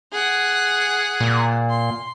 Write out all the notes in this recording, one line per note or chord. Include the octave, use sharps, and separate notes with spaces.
G#4 F#5
A#2
C6